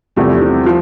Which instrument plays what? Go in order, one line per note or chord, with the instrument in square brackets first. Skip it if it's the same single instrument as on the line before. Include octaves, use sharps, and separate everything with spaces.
[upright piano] E2 C3 F3 A3 E4 [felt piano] G3
[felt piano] C4
[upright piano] F3